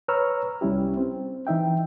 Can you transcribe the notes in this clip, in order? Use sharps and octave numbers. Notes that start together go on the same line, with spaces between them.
B4 C#5 A#5 C#6 E6 F6
C2 G3 C#4 E4 G4
C4
E3 D#4 E5 G5